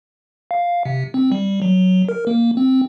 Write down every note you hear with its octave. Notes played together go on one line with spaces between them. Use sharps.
F5
C3
C4
G3
F#3
A#4
A#3
C4